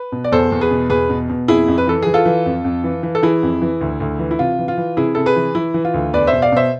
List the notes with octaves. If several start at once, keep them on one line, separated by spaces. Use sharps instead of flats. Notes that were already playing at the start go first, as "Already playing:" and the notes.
Already playing: B4
B2
D5
E2 A4 C5
E2
G#4 B4
B2
E2 G#4 B4
B2
B2
F2 E4 G#4
F2
B4
E3 A4
E3 G#4
F4 A4
E3
F2
F2
E3
E3
A4
E3 E4 G#4
F2
E3
D2
D2
E3
E4
C3 F4
E3
F4
E3
C3 E4 G#4
C3 A4
G#4 B4
E3
E3 E4
E3
F4
D2
E2 B4 D5
B2 C5 E5
D5 F5
B2 C5 E5